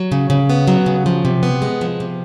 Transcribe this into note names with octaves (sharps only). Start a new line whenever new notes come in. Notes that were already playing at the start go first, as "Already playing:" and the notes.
Already playing: F#3
C#3
C#3
B3
F#3
C#3
F3
C3
B3
G#3
F3
C3